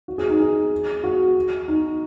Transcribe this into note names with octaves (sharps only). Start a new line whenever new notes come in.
F#4
G#4
D#4
G#4
F#4
D#4